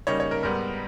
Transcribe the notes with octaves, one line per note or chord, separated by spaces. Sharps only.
C#3 G3 A#3 D#4 C#5
C#5
A#4
G#2 G3 B3 A#4